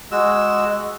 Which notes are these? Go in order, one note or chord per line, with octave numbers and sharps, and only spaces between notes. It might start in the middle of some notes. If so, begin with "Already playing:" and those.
G#3 F#4 E6